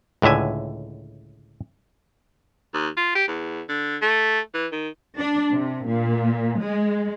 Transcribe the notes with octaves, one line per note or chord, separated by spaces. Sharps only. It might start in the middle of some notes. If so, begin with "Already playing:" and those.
C#2 A2 D3 E5 G#5
D#2
F4
G4
E2
D3
A3
E3
D#3
D4
C3
A#2
G#3